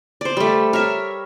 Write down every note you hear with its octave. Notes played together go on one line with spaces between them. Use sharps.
C5 D5
G3 A3
A#4 C#5 E5